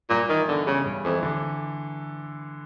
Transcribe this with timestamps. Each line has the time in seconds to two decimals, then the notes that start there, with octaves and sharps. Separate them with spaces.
0.10 G2 A#2
0.29 D#3 E3
0.48 D3 B3
0.67 C#3 G3
0.85 G2
1.05 F2 E3
1.23 D3